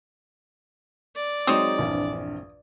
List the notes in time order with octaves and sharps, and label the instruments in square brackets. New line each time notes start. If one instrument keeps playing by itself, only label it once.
[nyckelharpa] D5
[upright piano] F#3 G#3 D#4 [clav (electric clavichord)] C4 C5 C#5 [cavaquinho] D#6
[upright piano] A#1 E2 G2